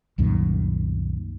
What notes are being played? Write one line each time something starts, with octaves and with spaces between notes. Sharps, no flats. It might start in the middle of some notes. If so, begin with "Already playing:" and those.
C2 F#2 A#2 D#3